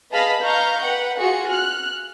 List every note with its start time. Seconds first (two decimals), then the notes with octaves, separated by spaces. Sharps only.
0.12 G#4 B4 D#5 F5 A5 B5
0.42 B4 D#5 F5 A#5 C#6 G6
0.83 B4 F#5 G5
1.20 F4 F#4 G#4 G#5 C#7
1.48 F6 F#6